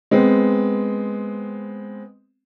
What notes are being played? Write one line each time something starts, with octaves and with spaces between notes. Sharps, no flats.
G#3 B3 C4